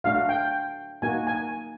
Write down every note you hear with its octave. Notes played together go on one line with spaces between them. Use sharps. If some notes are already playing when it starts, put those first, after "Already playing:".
A3 D4 F#4 F5
G5
A#3 D#4 F#4 G#5
G#5